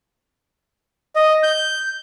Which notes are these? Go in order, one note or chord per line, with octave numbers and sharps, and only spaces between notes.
D#5
G6